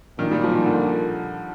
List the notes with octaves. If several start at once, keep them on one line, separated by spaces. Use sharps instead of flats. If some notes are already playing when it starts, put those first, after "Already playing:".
A#2 D#3
G3
F3
D#3
D3